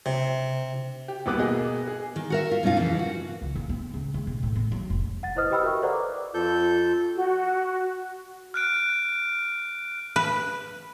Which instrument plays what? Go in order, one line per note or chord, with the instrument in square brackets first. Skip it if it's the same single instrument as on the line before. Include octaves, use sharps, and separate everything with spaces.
[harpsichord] C3
[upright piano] G4
D#1 C2 B3 B4 D6 F#6
B2 A#3 B3 G#4 D#5
G#4
[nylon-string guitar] D#3
F#4 A#4 E5
F4
F#2 B2 C#4 D#4 F4
F2 C#3 E3
F#4
[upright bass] C#2
D#4
B3
C#2
G#2
B2
A2
B3
F#3
F1
[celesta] F#5 A6
E4 B4 C5 D#5 D#6 F6
G4 D#5 G5 B5 D#6 E6
F#4 A#4 E5 C#6
A4 B4 C5 D5 F#5 A#5
D6
[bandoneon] F2 A4 G6 [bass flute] F4
[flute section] F#4
[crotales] F6 F#6 D7
[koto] B4